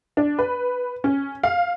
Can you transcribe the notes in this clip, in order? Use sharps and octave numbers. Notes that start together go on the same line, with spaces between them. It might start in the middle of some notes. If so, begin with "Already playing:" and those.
D4
B4
C#4
F5